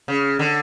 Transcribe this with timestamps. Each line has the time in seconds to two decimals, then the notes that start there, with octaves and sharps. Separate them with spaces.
0.08 C#3
0.39 D3